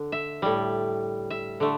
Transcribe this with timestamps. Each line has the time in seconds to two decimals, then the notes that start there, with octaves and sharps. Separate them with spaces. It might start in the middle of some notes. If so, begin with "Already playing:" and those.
Already playing: D3
0.12 E5
0.42 A2 G3
1.30 E5
1.60 D3 A3